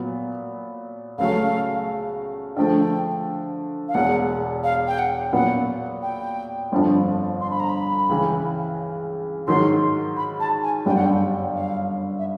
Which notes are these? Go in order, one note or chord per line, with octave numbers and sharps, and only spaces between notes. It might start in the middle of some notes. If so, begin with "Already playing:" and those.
Already playing: A#2 F#3 B3
C#2 C#3 F#3 A3 F5
D3 F3 A3 G5
F5
E1 E2 B2 F#5
F5
G5
F#5
A#2 F#3 B3 F#5
G5
G1 F2 D3 F3
C6
B5
A#5
B5
C#2 C#3 E3
G#2 D#3 F#3 C6
B5
A5
G#5
G1 F#2 D3 G3 G5
F#5
G5
F5
E5